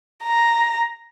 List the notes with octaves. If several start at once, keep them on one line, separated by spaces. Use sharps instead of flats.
A#5